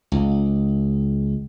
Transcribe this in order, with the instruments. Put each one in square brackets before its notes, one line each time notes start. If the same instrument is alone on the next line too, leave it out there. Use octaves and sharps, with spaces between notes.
[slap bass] C#2